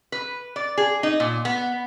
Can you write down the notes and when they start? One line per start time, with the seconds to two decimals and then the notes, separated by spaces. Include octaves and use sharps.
0.12 B4
0.56 D5
0.78 G#4
1.03 D#4
1.20 A#2
1.45 B3